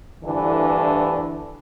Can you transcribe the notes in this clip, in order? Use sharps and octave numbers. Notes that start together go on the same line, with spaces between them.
D2 G2 D3 E3